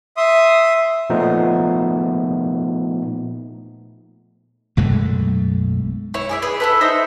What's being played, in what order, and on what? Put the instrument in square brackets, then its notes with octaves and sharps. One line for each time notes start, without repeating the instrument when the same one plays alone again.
[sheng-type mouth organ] E5 C6 D#6
[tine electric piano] A#2 F3 A3 B3 D#4
[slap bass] B1 F#2 G#3 A3
[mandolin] E4 C#5
G#4 D5 E5
G#4 B4
E4 A4 B4
D#4 C5 E5 A#5